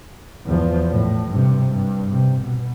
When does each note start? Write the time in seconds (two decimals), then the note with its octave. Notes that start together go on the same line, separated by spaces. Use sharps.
0.46 E2 F3
0.90 A2
1.30 G2 C3
1.67 G2
2.10 C3
2.40 B2